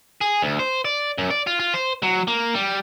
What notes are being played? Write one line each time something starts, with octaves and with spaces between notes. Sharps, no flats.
G#4
D2
C5
D5
F#2
D5
F4
F4
C5
F#3
A#3
G3